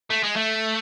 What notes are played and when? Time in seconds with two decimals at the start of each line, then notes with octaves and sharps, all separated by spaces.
0.10 A3
0.23 G#3
0.36 A3